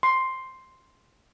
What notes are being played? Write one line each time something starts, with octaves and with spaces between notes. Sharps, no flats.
C6